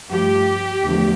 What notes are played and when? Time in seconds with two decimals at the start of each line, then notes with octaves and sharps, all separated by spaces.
0.10 G2 F3 A3 G4
0.84 E2 D3 F3 A3